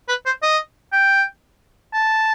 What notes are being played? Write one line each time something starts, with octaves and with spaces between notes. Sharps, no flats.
B4
C5
D#5
G5
A5